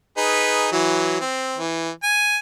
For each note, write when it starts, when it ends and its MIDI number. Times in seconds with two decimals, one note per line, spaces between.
0.17 0.71 63
0.17 0.71 68
0.17 0.71 71
0.72 1.19 52
0.72 1.19 54
1.20 1.58 60
1.58 1.90 52
2.03 2.37 80